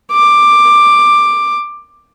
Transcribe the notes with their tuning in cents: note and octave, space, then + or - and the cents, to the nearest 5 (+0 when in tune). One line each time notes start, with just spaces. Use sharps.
D6 +10